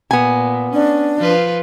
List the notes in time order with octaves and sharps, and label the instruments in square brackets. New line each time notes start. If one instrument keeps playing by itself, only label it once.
[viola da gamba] A#2 [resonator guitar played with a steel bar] B3 G#5
[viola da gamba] C#4 [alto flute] D4
[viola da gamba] F3 F4 B4